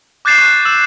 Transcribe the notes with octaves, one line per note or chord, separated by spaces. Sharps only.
D6 F#6 G6 A6 C7 E7
C#6 F#6
E6 E7